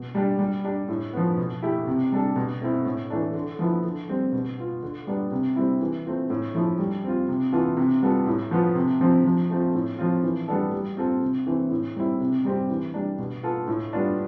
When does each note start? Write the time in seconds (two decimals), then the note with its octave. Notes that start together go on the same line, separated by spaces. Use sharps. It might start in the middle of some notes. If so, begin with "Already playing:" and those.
Already playing: B2
0.15 G3 D4 G4
0.39 G3
0.64 D4 G4
0.89 A2
1.13 F3 B3
1.38 B2
1.63 A3 E4 G4
1.87 C3
2.12 G3 D4 A4
2.36 B2
2.61 A3 C4 E4
2.85 A2
3.10 E3 A3 D4
3.34 D3
3.59 F3 B3 E4
3.84 D3
4.09 G3 C4
4.32 B2
4.58 B3 F4
4.83 D3
5.07 G3 B3 D4
5.32 C3
5.56 G3 C4 E4
5.81 E3
6.05 A3 C4 F4
6.30 A2
6.55 F3 A3 E4
6.78 G3
7.04 C4 F4
7.28 C3
7.52 E3 B3 F4 A4
7.77 C3
8.02 G3 B3 F4 A4
8.27 A2
8.51 F3 B3 F4
8.75 C3
9.01 F3 C4
9.24 F3
9.50 A3 C4 F4
9.75 A2
9.98 F3 C4 F4
10.23 E3
10.48 G3 B3 D4 A4
10.73 G3
10.97 C4 F4 A4
11.22 C3
11.47 E3 A3 C4
11.71 A2
11.96 G3 C4 E4
12.20 C3
12.45 G3 C4 G4
12.69 E3
12.94 G3 D4
13.19 B2
13.43 B3 F4 A4
13.68 A2
13.93 G3 B3 D4 F4